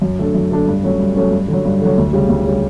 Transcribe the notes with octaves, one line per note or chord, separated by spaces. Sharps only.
F#2
D3 A3 D4 A4
F#2
D3 A3 D4 A4
G2
F#3 A3 C#4
G2
F#3 A3 C#4
G2
D3 F#3
G2
D3 F#3
D2
C#3 G3
D2
C#3 G3